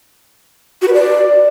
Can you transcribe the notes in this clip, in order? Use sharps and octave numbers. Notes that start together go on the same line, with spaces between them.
F#4
B4
D5